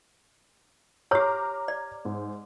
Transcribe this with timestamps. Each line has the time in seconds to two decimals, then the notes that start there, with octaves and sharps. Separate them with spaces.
1.11 G4 C#5 A#5 D6 F6
1.68 D5
2.05 G#2